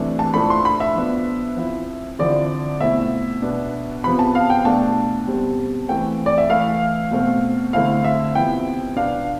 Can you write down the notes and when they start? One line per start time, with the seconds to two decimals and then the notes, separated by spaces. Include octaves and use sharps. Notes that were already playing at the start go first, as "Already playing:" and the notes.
Already playing: C3 E3 A3 D4
0.19 A5
0.34 A2 F3 A3 D4 B5
0.50 C6
0.65 B5
0.80 E5
0.95 F3 B3 D4
1.57 F3 C4 E4
2.19 D3 F3 C4 E4 D5
2.80 B2 A3 C4 E4 E5
3.42 B2 B3 D4
4.03 C3 F3 B3 B5
4.19 A5
4.35 F5
4.50 G5
4.65 B2 A3 D4 A5
5.27 B2 G3 C4
5.88 E3 A3 C4 G5
6.26 D5
6.38 E5
6.49 E3 A3 E4 F5
7.11 B2 A3 C4
7.73 D3 A3 C4 E4 F5
8.04 E5
8.35 C3 F3 B3 E4 G5
8.96 B2 B3 D4 F5